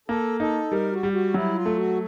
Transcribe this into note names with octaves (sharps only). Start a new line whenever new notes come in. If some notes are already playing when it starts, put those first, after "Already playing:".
A#3 A4
D#4 A4
G3 A#4
F#4
G3
F#4
F#3 E4
F4
A3
F#4